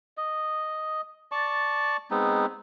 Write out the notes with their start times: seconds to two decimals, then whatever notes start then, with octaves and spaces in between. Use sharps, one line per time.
0.17 D#5
1.31 D5 A5 C#6
2.11 G#3 B3 C4 D#4